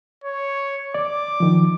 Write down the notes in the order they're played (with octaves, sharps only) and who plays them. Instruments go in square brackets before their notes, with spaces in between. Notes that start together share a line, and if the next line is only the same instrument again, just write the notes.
[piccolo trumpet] C#5
[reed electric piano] D5 [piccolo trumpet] D6
[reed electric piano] D#3 F3